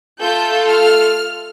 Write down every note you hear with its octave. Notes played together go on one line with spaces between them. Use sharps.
A3 F4 A4 G6
F6